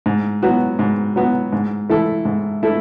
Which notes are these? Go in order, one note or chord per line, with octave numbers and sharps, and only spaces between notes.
G#2
F#3 B3 F#4
G#2
F#3 B3 F#4
G#2
E3 A3 E4 A4
G#2
A3 E4 A4